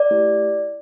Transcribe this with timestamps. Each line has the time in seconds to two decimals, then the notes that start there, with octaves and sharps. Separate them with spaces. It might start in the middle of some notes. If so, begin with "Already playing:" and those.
Already playing: D5
0.11 A3 E4 G4